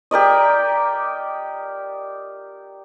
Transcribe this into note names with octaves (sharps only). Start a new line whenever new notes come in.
G4 A#4 D5 D#5